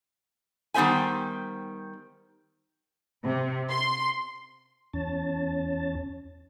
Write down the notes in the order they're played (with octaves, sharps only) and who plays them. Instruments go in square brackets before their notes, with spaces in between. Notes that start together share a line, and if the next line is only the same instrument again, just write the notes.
[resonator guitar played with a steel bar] D#3 G3 B3 C5 E5 G#5
[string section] C3
C6
[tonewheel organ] E2 C#4 A5